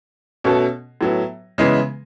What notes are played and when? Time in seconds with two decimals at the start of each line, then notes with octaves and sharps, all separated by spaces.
0.44 B2 A3 C#4 F#4 A4
1.01 A2 F#3 B3
1.58 C#3 E3 G#3 B3 E4